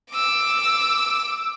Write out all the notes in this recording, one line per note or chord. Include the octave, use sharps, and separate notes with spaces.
D6 E6